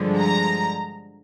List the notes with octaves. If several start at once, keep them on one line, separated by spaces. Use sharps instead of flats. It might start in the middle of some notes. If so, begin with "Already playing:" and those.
Already playing: G2 D3 F3 G#3
A#5